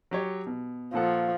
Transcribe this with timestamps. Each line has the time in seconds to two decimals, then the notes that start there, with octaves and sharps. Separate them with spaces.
0.11 F#3 G4 C#5
0.47 B2
0.94 A#2 F3 A4 F#5